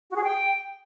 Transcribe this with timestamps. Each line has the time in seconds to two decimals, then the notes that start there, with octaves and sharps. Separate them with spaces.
0.09 F#4
0.16 G#4
0.23 G5